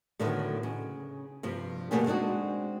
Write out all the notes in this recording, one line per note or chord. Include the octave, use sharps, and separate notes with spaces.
A2 D3 D#3 F#3 A3 B3
C#3
G2 C3 F3
B2 D3 A3 A#3 G4 G#4
G#3 C4 D4 D#4 F#4